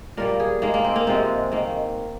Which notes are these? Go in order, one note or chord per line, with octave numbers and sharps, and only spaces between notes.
A#2 G3 A#3 A#4
G#4
D#3 G#3 A#3
A#3
C4
A#3
C3 F3 G#3 C4
D#3 A#3